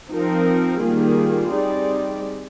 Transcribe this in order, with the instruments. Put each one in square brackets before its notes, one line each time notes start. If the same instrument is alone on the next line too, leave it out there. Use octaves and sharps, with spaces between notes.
[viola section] F3 C4 D#4 A#4
D#3 G3 A#3 F4 G#4
G3 C4 D#4 G#4 D5